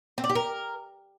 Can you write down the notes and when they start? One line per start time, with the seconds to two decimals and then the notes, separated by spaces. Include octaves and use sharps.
0.18 C4
0.24 D5
0.30 G4
0.35 A#4